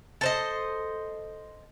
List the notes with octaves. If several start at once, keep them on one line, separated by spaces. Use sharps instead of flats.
A4 C5 D#5